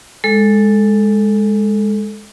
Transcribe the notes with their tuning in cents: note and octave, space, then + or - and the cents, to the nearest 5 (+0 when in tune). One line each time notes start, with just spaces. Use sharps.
G#3 -5 A4 +0